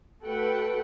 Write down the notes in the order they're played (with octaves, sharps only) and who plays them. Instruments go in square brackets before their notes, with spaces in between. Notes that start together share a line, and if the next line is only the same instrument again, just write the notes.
[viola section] A3 F#4 A4 B4 F#5 G5